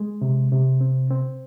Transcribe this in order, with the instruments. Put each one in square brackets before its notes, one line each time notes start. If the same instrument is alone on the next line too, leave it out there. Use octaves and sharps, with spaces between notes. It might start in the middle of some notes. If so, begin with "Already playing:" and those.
Already playing: [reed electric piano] G#3
C3
C3
C4
C4